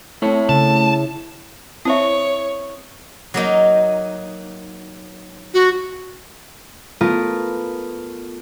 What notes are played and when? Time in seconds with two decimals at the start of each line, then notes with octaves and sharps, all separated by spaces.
0.22 A3 C4 E4 C#5
0.49 C#3 A5
1.85 C4 E4 C5 C#5 E5 C#6 D#6
3.34 F#3 A#3 D#4
5.54 F#4
7.01 A3 B3 F4 A#4